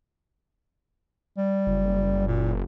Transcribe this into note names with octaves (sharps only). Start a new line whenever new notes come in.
G3
F#1
A#2